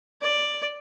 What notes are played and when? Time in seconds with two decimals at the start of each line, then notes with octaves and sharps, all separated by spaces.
0.21 D5